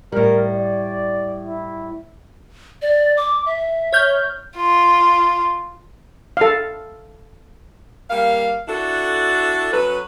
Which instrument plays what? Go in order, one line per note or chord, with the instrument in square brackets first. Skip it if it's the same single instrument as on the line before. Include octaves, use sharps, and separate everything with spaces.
[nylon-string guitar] A2 G3 [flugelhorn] A#4
[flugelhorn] D5
E4
[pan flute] D5
D6
E5
[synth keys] C#5 F6 G6
[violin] F4
[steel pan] A4 F5
[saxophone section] G3 A#3 F5
D4 E4 F#4 A4
F#3 C#4 A4 B4